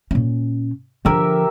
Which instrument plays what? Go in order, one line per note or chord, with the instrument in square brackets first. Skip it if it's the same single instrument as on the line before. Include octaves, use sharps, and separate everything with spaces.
[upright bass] A#2 C#4
[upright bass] D3 F3 [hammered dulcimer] G4 A#4 E5